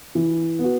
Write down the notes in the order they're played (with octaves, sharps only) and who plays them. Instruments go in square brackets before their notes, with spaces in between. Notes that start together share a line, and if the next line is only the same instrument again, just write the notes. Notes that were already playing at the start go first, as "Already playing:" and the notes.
[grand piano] E3
B3 F#4